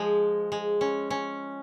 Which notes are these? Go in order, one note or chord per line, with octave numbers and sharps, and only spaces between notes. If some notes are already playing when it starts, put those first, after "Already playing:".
Already playing: F3 G#3
G#3
C#4
C#4